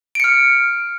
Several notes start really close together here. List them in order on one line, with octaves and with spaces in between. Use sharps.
D7 C#7 F6